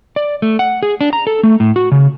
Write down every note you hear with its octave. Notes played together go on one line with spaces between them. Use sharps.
D5
A3
F#5
G#4
D4
A#5
A4
A3
A2
F#4
C#3